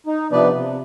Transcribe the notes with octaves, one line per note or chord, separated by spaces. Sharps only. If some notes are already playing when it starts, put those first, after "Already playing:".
D#4
C3 F3 B3 D4 B4 D5
C3